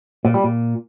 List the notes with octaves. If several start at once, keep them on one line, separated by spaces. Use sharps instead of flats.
A#2
G3
A#2